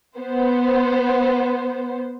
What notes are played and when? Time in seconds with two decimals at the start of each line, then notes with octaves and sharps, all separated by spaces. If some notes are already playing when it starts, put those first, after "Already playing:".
0.19 B3 C5